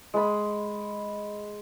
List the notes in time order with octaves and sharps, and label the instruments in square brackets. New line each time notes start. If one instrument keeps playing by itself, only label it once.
[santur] G#3 B5